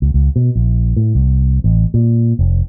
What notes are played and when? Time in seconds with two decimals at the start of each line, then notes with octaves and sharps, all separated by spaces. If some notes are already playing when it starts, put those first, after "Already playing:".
0.02 C#2
0.14 C#2
0.36 B2
0.56 A#1
0.97 A2
1.15 C2
1.64 A1
1.94 A#2
2.39 F1